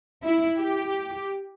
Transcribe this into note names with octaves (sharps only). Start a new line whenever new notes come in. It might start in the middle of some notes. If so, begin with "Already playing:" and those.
E4
G4